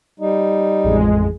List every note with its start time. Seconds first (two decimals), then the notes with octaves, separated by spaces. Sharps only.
0.20 G3 D#4
0.84 A1 F2 G#3